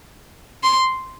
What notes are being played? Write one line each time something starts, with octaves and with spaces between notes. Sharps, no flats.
C6